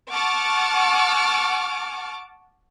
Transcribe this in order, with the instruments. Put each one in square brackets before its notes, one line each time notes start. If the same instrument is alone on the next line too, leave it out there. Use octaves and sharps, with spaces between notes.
[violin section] F#5 A5 C#6 D6 F6